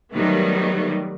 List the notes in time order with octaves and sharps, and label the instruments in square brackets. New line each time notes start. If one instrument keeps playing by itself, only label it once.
[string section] D#3 F#3 G3 A3 B3